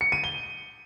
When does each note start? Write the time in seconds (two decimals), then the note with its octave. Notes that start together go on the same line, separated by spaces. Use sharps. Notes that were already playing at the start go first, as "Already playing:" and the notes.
0.01 C#7
0.12 D#7
0.24 G7